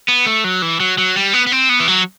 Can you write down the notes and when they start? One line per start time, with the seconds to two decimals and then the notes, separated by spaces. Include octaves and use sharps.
0.08 B3
0.26 A3
0.44 F#3
0.62 E3
0.80 F#3
0.98 F#3
1.16 G3
1.33 B3
1.47 B3
1.52 C4
1.69 B3
1.80 E3
1.88 F#3